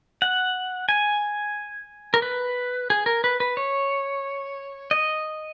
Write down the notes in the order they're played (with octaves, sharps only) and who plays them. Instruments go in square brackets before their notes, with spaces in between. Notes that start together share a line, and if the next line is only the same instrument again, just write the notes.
[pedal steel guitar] F#5
G#5
A#4
B4
G#4
A#4
B4
B4
C#5
D#5